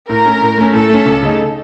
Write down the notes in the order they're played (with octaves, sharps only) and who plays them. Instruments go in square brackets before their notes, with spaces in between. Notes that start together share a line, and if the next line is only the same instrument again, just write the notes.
[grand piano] A2 [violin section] A#4
[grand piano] A3 C#4
A2
A3 C#4
[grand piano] A2 [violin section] A4
[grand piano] A3 C#4
C#2
C#3 A3 D#4